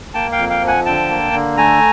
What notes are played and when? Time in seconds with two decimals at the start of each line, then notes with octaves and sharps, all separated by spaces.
0.14 A#3 G5 A5
0.32 F5 G5
0.38 F2
0.50 F5 G5
0.62 F3
0.67 F#5 G#5
0.85 D3 G5 A5
1.10 A#3
1.33 D3
1.57 A3 G#5 A#5